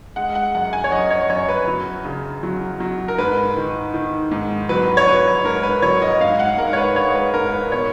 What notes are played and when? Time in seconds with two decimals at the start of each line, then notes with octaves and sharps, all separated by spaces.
0.16 G#3 F#5
0.35 F#5
0.55 F#2 F#5
0.73 G#5
0.84 C#5
0.92 F#2 D#5
1.11 C#5
1.30 F#2 C#5
1.49 B4
1.68 F#3
2.05 C#3
2.43 F#3
2.80 F#3
3.08 A#4
3.18 G#2 B4
3.57 D#3
3.94 D#3
4.31 G#2
4.69 F#3 B4
4.97 C#5
5.07 F#3 B4
5.45 G#2 A#4
5.63 B4
5.82 F#3 C#5
6.02 D#5
6.21 G#2 F5
6.39 F#5
6.58 G#2 A#4
6.73 C#5
6.77 B4
6.96 G#3 C#5
7.15 B4
7.34 G#2 A#4
7.53 B4
7.72 B2 C#5